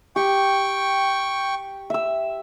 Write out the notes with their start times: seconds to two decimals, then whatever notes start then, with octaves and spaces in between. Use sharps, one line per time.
0.16 G4 G5 C#6
1.90 E5 E6